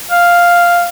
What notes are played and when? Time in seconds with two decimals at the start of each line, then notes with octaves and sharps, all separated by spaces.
0.11 F5